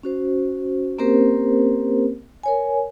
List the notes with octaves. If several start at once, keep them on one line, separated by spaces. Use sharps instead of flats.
C#4 F#4 C5
A#3 C4 C#4 G4 A#4 C5
A#4 C#5 G#5